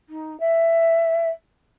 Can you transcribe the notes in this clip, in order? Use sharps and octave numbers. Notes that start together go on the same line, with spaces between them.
D#4
E5